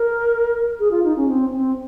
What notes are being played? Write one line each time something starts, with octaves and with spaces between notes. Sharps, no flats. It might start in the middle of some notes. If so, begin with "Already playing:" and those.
Already playing: A#4
G#4
F4
D#4
C#4
C4
C4